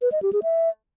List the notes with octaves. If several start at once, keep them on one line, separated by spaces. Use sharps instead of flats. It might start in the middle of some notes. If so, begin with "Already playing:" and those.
B4
D#5
G4
G#4
E5